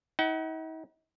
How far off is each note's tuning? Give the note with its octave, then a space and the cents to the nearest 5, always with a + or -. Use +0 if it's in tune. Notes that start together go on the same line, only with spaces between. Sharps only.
D#4 +45 F#5 +35